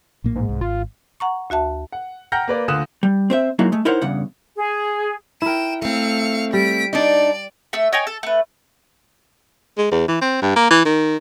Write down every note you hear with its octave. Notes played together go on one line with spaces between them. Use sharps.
A#1 A2 A#3
G#2
C2
G#1 F4
F#5 A#5 C#6
D2 F#4 E5 A5
F#5
F#5 G5 A#5 F6 G6 A#6
A#3 B4 D5
D2 D3 F4 D#6 F#6 E7
G3
C4 C5 E5
F#3 G#3 A#3 D#4 E4 F#4
G#3 A3
D#4 E4 A#4 C5 C#5 F#5
E2 G2 C#3 F#5
G#4
E4 A#4 G5 E7
A3 C4 F5 C#7
G3 B6 D7
D4 D#4 D5
A3 E5
C#5 D#5 G5 G#5
A4
A3 B4
G#3
E2
E3
C4
G2
A#3
E3
D#3